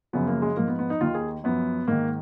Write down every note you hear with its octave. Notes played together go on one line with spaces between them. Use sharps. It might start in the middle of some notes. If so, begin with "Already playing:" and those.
F#2 C#3 F3 B3
A#3
G#3
G#2 F3 A#3
B3
B3
D#4
D#2 D#3 F4
G#4
F#2 F3 B3
G#2 D#3 A#3